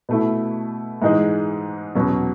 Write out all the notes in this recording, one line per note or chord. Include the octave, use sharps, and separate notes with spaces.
B2 A3 E4
G#2 E3 G#3 D#4 G#4
E2 B2 F#3 C#4